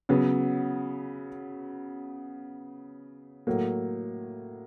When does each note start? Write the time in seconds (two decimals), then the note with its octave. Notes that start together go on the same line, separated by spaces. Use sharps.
0.09 C#3 F#3 B3
3.47 A2 F#3 A#3